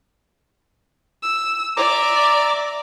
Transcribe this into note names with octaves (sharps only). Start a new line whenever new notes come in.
E6
D5 E5 A#5 D6